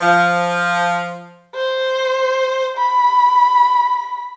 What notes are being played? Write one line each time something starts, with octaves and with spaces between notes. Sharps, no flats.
F3
C5
B5